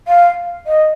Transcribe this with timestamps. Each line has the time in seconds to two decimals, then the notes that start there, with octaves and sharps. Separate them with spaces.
0.08 F5
0.67 D#5